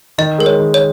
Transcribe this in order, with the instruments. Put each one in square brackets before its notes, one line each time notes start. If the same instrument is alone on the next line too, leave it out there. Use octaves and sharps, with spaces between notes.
[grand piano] D#3 [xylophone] D#5
[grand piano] G#3 [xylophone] A#4
[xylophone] C#5
[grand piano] D#3
[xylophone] C#5